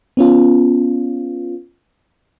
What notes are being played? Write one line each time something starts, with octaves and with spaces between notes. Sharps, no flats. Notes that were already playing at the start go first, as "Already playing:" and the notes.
B3 C#4 F4